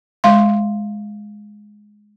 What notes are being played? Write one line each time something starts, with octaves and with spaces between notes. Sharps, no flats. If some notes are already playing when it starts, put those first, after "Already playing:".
G#3 F5 C6